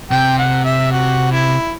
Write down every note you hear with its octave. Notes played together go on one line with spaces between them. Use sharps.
C3 G5
F#5
E5
F#4
E4